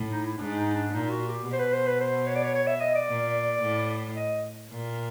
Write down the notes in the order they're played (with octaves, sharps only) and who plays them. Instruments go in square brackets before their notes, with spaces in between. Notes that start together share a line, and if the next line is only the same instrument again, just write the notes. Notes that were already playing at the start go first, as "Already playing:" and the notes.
Already playing: [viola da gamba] A2
[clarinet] D#4
E4
[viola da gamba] G#2 [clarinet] D4
[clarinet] D#4
D4
[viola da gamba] A#2 [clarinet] D#4
[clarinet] F#4
G4
[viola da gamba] B2
[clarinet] C5
B4
C5
B4
C5
C#5
D5
C#5
C#5
E5
D#5
D5
[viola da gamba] A#2
A2
[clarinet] D#5
[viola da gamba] A#2